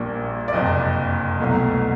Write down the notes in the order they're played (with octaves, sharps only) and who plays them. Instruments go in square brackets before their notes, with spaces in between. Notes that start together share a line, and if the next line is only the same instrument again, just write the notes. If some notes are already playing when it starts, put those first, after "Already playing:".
Already playing: [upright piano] A#1 A#2 G3
D5
F#1 F2 C3 D#5
C2 B2 F#3 A3